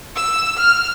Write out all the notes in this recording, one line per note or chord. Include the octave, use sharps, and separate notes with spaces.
E6
F6